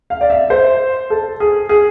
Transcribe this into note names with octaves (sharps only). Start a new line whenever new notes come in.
F5
D5
E5
C5
A4
G#4
G#4